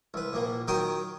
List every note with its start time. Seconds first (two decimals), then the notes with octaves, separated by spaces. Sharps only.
0.14 C2 B4
0.33 A#1 A#3
0.68 D#3 F#3 A#4 G5 A#5 D#6